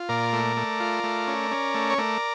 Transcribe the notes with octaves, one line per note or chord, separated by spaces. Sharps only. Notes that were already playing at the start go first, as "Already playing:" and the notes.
Already playing: F4
A#2 A#4 D5
A3
A3
F4
A3
C#4
C#4
A3
C#5
A3 A#4 D5